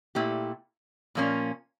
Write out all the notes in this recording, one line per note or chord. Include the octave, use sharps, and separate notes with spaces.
A#2 A3 E4 G4
A#2 F3 A#3 C#4